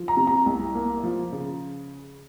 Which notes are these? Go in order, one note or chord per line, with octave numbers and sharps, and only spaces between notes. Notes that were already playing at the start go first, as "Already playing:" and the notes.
Already playing: F3
A#5
C3
A#5
C2
A#3
F3
C#3